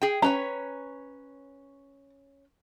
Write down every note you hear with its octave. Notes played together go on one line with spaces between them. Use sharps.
G#4 G5
C#4 B4 C#5 A#5